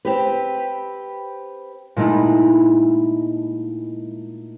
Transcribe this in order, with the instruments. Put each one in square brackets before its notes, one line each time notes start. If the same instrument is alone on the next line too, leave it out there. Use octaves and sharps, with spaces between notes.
[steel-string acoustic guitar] C4 G4 B4
[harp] A#2 G#3 A3 D#4 E4